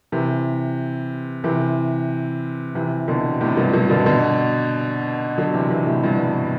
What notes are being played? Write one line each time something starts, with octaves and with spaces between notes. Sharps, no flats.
C3 E3
C3 E3
C3 E3
B2 D3
A2 C3
G2 B2
G2 B2
B2 D3
B2 D3
D3 F#3
C3 E3
C3 E3
A2 C3
G2 B2
G2